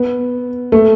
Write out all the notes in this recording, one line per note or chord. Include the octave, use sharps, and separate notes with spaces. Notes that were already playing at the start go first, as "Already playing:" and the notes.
Already playing: B3
A3